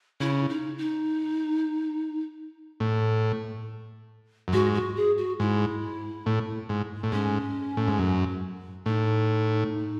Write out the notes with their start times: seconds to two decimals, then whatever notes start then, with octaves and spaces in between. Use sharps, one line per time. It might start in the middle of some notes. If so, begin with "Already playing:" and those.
0.20 C#3 E4
0.49 D#4
0.78 D#4
2.80 A2
4.48 F#2
4.53 G#2 F#4
4.74 F#4
4.96 G#4
5.17 F#4
5.40 G#2 E4
6.26 A2
6.69 G#2
7.03 A2
7.12 G#2 C#4
7.77 A2
7.88 G#2
7.99 F#2
8.86 A2 D#4